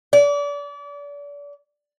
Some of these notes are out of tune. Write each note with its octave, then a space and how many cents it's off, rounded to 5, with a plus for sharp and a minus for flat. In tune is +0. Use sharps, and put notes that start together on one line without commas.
D5 -35